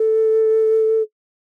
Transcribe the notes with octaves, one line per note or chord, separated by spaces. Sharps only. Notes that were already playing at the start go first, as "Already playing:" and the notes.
Already playing: A4